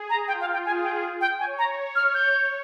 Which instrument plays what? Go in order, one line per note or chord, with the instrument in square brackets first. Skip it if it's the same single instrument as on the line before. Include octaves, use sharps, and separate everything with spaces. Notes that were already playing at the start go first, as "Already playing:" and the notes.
Already playing: [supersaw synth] G#4
[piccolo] A#5
[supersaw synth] F4 [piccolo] G5
[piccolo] F5
G5
[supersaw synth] G#4 [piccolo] G#5
[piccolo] G5
G5
[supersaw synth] C#5 [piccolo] G#5
[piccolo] A#5
[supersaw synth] C#5
[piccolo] F6
G6